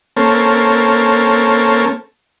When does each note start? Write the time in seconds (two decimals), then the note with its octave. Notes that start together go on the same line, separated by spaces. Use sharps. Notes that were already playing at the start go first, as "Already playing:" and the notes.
0.17 A#3 C4 C#4 A4